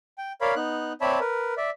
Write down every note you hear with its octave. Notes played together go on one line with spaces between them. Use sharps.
G5
A#4 C#5 D5 F5 B5
B3 D#4 F#6
C4 C#5 D5 E5 A5 B5
A#4 B4
D5 E5